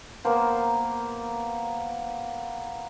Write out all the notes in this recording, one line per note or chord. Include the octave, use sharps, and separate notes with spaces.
A#3 B3 A#4 C5